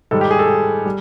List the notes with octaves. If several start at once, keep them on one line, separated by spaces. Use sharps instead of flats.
G#2 D#3 G3 A4
G4
G#4
A4
G3